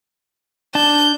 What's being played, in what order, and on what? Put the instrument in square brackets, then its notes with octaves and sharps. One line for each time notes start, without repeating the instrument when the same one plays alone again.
[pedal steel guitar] D4 A5 [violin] G6